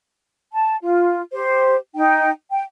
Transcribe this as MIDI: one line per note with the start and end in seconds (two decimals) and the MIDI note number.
0.53 0.76 81
0.83 1.22 65
1.32 1.77 67
1.32 1.77 72
1.95 2.30 63
1.95 2.30 79
2.52 2.62 79